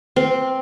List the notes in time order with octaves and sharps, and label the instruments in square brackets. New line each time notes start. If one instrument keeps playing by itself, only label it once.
[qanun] C4